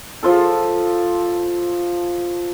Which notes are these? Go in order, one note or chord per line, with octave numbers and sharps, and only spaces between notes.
F3 F4 A4